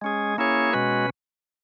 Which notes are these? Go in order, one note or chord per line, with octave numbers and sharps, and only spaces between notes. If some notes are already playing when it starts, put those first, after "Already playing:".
G#3 C#4 G#4
A#3 C#4 E4 G#4 C#5
B2 G#3 C#4 F#4 B4